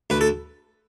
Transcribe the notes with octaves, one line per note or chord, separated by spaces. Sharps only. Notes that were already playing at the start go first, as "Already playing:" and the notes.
D2 B4
A4